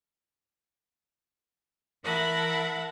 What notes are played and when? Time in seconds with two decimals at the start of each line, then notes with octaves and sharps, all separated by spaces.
2.05 E3 A#4 E5 F#5 A5 B5